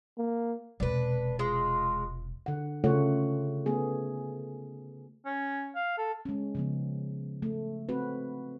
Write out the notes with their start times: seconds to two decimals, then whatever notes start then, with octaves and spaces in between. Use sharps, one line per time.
0.18 A#3
0.80 E1 C3 D4 B4
1.39 G#3 F4
2.46 D3 F#5
2.84 C#3 A3 F4 A4 C#5 F#5
3.66 A3 B3 G#4
5.26 C#4
5.75 F5
5.98 A4
6.25 G#3 C#4
6.55 C#3 F3 B3
7.42 A3
7.89 A3 C4 F#4 B4